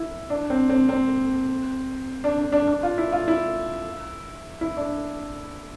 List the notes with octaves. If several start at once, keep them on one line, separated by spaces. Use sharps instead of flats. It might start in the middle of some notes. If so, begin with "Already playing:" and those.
Already playing: E4
D4
C4
C4
C4
D4
D4
D4
D4
F4
E4
F4
E4
E4
D4